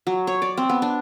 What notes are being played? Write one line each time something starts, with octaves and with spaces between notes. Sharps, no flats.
F#3
C#5
D5
C4
B3
D4